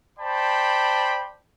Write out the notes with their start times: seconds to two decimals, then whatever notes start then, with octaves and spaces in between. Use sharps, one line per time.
0.19 C5 D5 G5 A5 B5